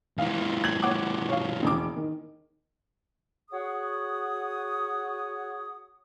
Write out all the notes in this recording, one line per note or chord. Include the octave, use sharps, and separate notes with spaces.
C#2 E3 F5
G#6 F#7
C#5 F#5 D6
C#5 F5
E1 A1 D6
D#3
F#4 G#4 C#5 F#5 D#6